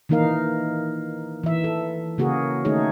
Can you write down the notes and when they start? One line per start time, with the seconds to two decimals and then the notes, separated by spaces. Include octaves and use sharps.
0.09 D#3 E3 A#3 D#4 A#4 F5
1.43 E3 E5
1.64 A4
2.18 C#3 A#3 F#4 G#4 A#4
2.65 D#3 A3 D#4 G#4 C#5